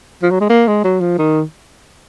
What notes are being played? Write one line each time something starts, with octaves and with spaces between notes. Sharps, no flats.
F3
F#3
G#3
A#3
G#3
F#3
F3
D#3